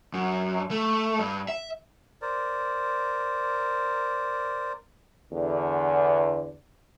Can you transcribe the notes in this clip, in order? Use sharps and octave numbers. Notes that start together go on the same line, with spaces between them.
F#2
A3
G2
E5
A#4 C5 D5
E2 D3